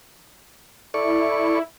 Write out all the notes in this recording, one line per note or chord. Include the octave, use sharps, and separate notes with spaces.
E4 A4 D5 C#6